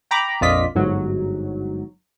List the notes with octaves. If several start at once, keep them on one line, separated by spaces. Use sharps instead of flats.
G5 A#5 B5 D6
A#1 F2 F4 D5 D#5 B6
G1 G#2 F#3